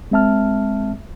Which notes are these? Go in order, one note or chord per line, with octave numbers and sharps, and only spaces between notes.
G#3 C4 E5 A5 F6